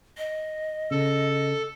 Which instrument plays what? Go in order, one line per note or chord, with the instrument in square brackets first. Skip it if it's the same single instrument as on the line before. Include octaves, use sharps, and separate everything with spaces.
[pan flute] D#5
[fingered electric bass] C#3 [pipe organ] A4